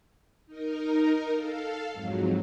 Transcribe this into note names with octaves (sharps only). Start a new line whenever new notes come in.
D#4 A#4
A4 F5
F2 G#2 F#3